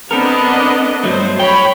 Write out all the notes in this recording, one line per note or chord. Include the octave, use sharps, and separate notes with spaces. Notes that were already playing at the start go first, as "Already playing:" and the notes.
B3 C4 D4 A4 A#4 D#5
G2 F#3 A3 C5
C#5 G5 B5